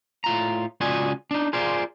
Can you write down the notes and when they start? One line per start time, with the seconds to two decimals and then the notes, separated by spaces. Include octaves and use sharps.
0.24 A2 F4 A#5
0.81 C#2 F4 F#4 D5 D#5 G#5
1.31 D4 D#4
1.53 F4 G#4 A#4 C5 D5 F5